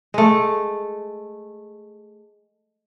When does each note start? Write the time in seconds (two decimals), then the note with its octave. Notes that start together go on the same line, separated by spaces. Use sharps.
0.14 G#3 A3